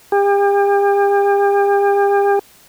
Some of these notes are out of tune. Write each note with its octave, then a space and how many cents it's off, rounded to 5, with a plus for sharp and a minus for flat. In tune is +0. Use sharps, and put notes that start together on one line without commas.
G4 +40